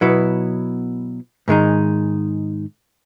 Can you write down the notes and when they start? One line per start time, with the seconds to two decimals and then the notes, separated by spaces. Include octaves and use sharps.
0.01 B2 F#3 B3 E4
1.48 G#2 D#3 G#3 D#4